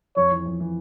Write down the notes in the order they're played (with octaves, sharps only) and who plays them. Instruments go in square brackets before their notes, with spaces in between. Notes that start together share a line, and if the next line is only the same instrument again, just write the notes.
[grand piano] F2 [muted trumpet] C#5
[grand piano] E3
F2
E3